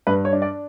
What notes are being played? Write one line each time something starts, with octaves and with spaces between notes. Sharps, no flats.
G2 B4
C#5
D4
D5